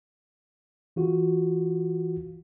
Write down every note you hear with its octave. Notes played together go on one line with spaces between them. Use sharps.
E3 F4 F#4